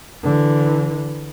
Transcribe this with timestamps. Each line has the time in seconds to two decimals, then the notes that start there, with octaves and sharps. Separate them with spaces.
0.23 D3 E3